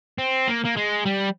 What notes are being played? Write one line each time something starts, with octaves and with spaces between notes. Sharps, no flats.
C4
A#3
A#3
G#3
G3